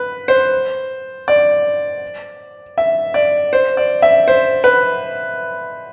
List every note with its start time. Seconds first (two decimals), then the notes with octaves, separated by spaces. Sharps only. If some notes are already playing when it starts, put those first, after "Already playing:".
Already playing: B4
0.28 C5
1.28 D5
2.78 E5
3.14 D5
3.53 C5
3.77 D5
4.02 E5
4.28 C5
4.64 B4